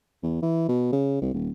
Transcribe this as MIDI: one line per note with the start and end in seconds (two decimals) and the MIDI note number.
0.23 0.41 40
0.42 0.66 52
0.69 0.92 47
0.93 1.21 49
1.22 1.34 36
1.34 1.50 27